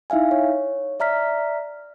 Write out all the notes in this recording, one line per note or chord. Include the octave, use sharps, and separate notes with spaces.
D#4 E4 E5 F5 G#5
C#5
D5 E5 A#5 F6 B6